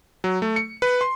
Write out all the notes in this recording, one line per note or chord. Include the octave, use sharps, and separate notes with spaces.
F#3
A3
C#7
B4
C6